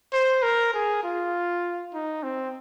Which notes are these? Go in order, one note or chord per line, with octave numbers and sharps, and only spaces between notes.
C5
A#4
G#4
F4
D#4
C4